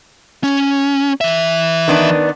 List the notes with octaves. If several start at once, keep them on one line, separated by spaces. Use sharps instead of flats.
C#4
E3 E5
D#3 B3 D4